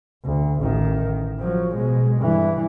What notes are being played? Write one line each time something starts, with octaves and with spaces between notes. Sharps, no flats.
D2
A1 D#3
F3 F#3
B2 G#3
G2 E3